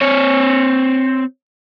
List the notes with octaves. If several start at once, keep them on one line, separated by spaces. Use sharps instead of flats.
C4 C#5